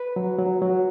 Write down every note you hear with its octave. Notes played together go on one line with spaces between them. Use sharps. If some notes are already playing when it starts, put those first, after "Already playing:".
Already playing: B4
F#3
F#3
F#3